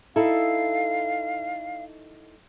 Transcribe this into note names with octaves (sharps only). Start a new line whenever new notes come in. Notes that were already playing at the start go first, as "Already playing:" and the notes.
D#4 E4 A4 F5